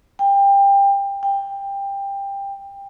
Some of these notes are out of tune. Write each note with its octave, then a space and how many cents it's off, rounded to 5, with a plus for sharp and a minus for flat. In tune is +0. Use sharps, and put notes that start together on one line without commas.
G5 +25
G5 +20